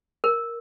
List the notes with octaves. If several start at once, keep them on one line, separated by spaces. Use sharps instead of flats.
A#4